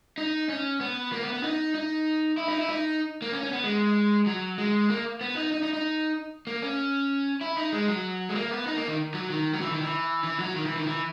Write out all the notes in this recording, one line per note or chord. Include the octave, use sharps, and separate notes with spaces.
D#4
C#4
B3
A#3
B3
B3
D#4
D#4
E4
D#4
E4
D#4
A#3
C#4
C#4
B3
G#3
F#3
G#3
A#3
B3
D#4
D#4
D#4
D#4
A#3
C#4
E4
D#4
G#3
F#3
G#3
A#3
B3
D#4
A#3
D#3
F#3
D#3
F#3
E3
D#3
E3
E3
F#3
D#3
E3
D#3
E3